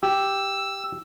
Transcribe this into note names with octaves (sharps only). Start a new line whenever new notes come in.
G4 E6